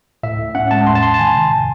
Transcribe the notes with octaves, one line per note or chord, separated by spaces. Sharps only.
A2 E5
A2
C#4 F#5
G#3 A5
E2 C6
A5
E2 C6
A5
D#3 G#5
C3
A2